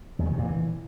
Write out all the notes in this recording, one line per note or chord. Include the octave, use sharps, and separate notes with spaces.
E2
D#3
C3
A#2
E3